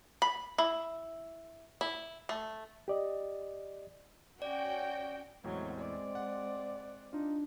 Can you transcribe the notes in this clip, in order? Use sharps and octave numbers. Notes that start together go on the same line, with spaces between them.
B5
E4
E4
A3
G4 D5 D#5
C#4 F#4 D5 G5
E2 A2 F#3 G#3 C4
D5
F#5
D4 D#4 F4